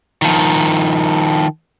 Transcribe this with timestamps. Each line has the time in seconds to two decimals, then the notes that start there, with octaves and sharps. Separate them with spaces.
0.22 D#3 F3